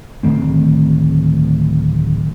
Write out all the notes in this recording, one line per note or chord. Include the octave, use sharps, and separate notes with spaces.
D1 D#3 A3 C4